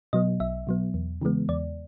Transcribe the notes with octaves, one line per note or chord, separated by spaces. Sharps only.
B2 F#3 B3 D#5
B1 E5
B2 F#3 B3
E2
C#3 E3 G#3 B3
E2 D5